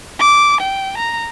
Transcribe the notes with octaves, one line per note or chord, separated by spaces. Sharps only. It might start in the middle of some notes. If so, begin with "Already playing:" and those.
D6
G5
A#5